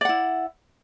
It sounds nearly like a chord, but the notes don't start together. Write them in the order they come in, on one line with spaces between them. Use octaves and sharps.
D5 F#5 E4